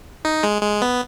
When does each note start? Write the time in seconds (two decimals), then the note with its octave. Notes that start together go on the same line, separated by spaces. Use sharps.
0.25 D#4
0.43 G#3
0.62 G#3
0.82 B3